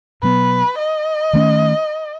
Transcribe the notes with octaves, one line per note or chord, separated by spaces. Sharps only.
B2 F#3 B3 B4
D#5
D#3 A3 C#4